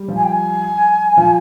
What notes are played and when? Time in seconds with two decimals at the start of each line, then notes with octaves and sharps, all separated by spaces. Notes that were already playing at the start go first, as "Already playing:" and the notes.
Already playing: G3
0.08 F3 F4
0.16 G#5
0.24 G5
0.31 G#5
1.17 F3 F4